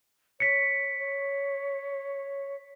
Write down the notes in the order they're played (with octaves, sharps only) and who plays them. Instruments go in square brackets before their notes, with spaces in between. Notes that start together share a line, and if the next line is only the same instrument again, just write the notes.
[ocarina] C#5 [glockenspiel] B6 C#7
[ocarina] C#5